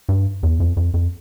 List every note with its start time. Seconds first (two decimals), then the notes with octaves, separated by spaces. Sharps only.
0.09 G2
0.43 E2
0.60 F2
0.77 F2
0.94 F2